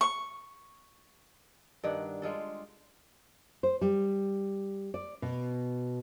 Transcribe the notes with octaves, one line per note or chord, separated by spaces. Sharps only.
C#6
G2 D#3 D4 F#5
G3 G#3 F4 A4
C5
G3
D5
B2